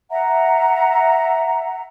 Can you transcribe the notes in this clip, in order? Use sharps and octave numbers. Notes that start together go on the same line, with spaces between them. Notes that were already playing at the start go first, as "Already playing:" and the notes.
E5 F#5 A#5